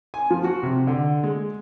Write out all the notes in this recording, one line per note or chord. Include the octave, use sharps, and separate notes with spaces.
G#5
F3
F#4
C3
D3
G#3